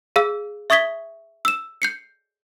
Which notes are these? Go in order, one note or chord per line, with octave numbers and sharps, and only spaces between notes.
G#4 F5 E6
E5 C#6 D#6 G#6 B6 G7
E6 E7
G6 C7 C#7